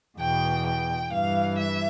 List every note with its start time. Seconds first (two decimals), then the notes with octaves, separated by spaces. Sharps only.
0.19 E2 B2 G5
0.65 G5
1.12 G2 E3 F5
1.58 E5